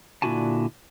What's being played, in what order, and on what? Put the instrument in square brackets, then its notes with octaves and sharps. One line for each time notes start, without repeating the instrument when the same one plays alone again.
[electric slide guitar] A#2 D3 E4 F#4 G#5 A5